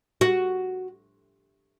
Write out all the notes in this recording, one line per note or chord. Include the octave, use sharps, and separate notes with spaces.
F#4